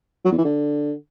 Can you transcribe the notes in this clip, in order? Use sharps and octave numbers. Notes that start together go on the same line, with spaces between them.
F#3
E2
E3
D3